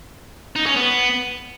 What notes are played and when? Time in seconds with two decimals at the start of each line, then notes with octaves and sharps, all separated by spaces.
0.56 D#4
0.66 C#4
0.76 B3